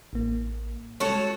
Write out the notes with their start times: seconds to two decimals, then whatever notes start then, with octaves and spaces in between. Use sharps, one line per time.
0.13 A1 A#3
1.00 G3 G#3 F#4 A4 C#5